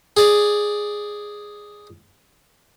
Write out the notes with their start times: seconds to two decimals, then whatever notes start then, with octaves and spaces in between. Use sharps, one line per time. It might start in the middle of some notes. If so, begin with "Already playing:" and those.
0.17 G#4 D5